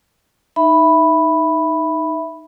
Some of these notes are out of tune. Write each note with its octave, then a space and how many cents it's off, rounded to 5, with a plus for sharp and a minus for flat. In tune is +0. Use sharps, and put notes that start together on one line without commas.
D#4 +0 E5 +0 B5 +0